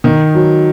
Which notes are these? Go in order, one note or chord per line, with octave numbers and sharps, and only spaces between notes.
D#3
F#3